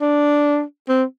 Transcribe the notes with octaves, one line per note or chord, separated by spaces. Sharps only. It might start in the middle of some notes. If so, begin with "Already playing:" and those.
D4
C4